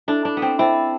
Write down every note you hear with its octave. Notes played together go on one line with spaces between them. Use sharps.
D4 E4 A4 D5
D4
B3
C4
C4 E4 A4 D5